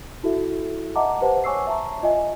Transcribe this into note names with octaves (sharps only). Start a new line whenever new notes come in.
E4 F#4 A4 E5
D#5 E5 F#5 A5 A#5 D6
G4 B4 C5 F#5 A5
C#5 G#5 C#6 D6 E6 C7
E5 A5 A#5 C#6
F4 D#5 E5 G#5